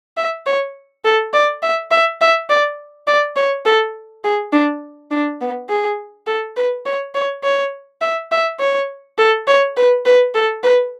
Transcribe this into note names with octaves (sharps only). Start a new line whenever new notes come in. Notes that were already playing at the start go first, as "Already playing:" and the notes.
E5
C#5
A4
D5
E5
E5
E5
D5
D5
C#5
A4
G#4
D4
D4
B3
G#4
A4
B4
C#5
C#5
C#5
E5
E5
C#5
A4
C#5
B4
B4
A4
B4